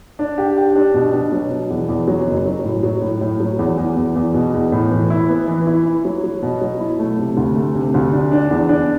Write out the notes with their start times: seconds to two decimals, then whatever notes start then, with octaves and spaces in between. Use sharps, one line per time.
0.19 D4
0.38 G4
0.57 G4
0.75 D4
0.94 B2
1.13 B2
1.32 F#3
1.51 B2
1.70 E2
1.89 E2
2.08 F#3
2.27 F#1
2.46 F#3
2.64 A2
2.83 F#3
3.02 A2
3.21 A2
3.40 F#3
3.59 E2
3.78 E2
3.97 E2
4.16 E2
4.34 B2
4.54 E2
4.72 A2
4.92 E3
5.10 E4
5.29 B3
5.48 E3
5.67 E4
5.86 E4
6.05 F#3
6.24 F#3
6.42 B2
6.61 F#3
6.80 E4
6.99 A3
7.19 C3
7.37 D2
7.56 A3
7.75 C3
7.94 D2
8.13 D4
8.32 D4
8.51 E2
8.69 D4